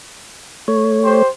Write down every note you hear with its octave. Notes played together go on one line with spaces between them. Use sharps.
A3 C#5
G4 C5